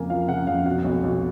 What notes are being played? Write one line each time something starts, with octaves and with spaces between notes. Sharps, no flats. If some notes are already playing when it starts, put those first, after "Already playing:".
Already playing: F2 C#3 A#3 G#5
F3 F5
C#3 F#5
F2 F5
B2 F#5
B1
B1